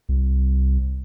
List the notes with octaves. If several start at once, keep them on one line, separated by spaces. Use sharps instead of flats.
C2